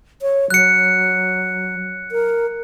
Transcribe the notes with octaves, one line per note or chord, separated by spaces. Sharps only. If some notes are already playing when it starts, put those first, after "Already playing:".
C#5
F#3 F#6 C#7
A#4